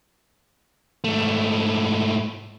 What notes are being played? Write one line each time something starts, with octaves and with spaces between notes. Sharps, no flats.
G#2 A3